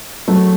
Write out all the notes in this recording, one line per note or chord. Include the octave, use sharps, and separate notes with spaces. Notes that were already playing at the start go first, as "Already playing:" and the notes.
F#3 A3